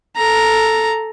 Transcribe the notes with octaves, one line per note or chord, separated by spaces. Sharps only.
A4 A#5